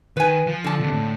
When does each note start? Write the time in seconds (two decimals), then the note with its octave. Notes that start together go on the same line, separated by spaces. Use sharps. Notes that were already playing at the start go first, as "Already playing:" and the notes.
0.17 D#3 B4 G#5
0.47 F3
0.64 D3 A5
0.80 D#2 C3
0.94 A2